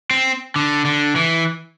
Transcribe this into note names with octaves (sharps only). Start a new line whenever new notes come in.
C4
D3
D3
E3